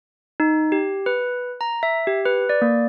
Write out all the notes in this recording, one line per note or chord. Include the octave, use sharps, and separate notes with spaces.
D#4
G4
B4
A#5
E5
G4
B4
D5
A#3